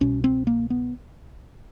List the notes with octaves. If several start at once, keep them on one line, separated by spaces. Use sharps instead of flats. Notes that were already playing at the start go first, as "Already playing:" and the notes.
C2 B2 C#4
C4
A#3
B3